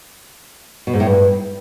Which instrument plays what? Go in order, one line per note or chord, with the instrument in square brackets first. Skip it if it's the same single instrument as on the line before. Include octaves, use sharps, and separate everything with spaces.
[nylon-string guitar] B2
G#2
A2
G2